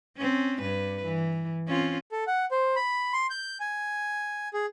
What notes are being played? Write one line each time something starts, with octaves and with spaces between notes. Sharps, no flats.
C4 C#4
G2 B4
E3
C4 C#4 F4
A4
F#5
C5
B5
C6
G6
G#5
G#4